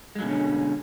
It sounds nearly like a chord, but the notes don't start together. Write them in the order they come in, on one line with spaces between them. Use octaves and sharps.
G#3 F#3 B2 D3 C#4